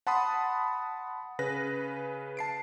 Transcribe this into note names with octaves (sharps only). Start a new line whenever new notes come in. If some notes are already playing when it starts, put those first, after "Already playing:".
F#5 A5 B5 C6 D#6
C#3 B4 A#6
A5 C7 D7